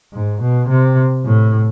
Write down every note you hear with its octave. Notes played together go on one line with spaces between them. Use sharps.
G#2
B2
C3
A2